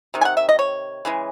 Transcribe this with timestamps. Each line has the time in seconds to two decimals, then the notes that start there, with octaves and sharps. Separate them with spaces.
0.14 C3 D#3
0.21 G#5
0.25 F#5
0.37 E5
0.49 D#5
0.59 C#5
1.05 C#3 E3 G#3